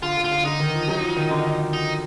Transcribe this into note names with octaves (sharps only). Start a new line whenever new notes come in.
D3 F4
D3
F4
D3
D3 D#4
D#3
F3
F#3
F3
D#3
D3
D#4